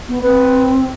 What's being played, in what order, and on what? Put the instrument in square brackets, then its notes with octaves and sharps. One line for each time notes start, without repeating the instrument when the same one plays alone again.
[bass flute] B3
[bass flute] C4 [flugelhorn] B4